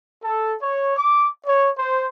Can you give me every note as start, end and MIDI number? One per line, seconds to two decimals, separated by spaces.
0.23 0.55 69
0.61 0.95 73
0.97 1.30 86
1.47 1.71 73
1.78 2.07 72